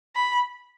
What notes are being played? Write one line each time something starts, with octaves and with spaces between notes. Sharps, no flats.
B5